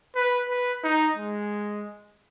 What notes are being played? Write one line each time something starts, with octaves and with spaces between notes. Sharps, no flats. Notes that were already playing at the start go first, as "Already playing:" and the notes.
B4
B4
D#4
G#3